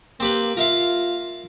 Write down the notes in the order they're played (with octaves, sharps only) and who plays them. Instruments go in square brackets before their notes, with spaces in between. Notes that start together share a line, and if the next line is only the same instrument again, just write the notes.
[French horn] A#3 [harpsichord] C4 G4 B4
[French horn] F4 [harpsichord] A#4 E5 F5